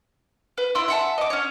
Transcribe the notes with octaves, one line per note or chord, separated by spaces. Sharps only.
B4
E4 C6 E6
E5 F#5 A5
D#5 D6
C#4 C#5